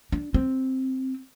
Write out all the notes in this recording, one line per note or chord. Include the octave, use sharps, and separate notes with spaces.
D4
C4